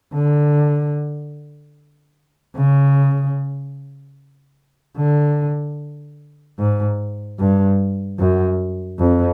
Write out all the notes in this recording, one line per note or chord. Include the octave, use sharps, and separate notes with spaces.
D3
C#3
D3
G#2
G2
F#2
F2